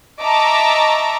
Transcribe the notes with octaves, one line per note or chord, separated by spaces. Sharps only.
D#5 E5 A5 A#5 C#6 D6